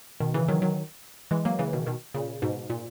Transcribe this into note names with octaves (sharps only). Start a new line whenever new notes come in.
B2 D#3
C#3 E3
D#3 F#3
D#3 F#3
E3 G#3
F#3 A#3
C#3 E3
B2 D#3
B2 D#3
A#2 C#3
G#2 B2
A#2